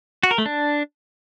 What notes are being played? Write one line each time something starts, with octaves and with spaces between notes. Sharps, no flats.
F#4
A#4
A3
D4